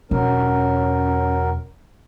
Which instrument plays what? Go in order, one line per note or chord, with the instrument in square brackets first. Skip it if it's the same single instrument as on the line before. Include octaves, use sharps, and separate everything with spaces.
[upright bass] E1 [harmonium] F#3 A#4 [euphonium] C#4